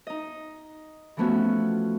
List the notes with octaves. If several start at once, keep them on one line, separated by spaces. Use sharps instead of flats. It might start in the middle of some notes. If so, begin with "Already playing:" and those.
D#4 D#5
E3 F3 A3 B3 C#4 F#4